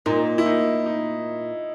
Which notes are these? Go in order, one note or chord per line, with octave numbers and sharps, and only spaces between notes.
A#2 D#4
E4
D#4
D#4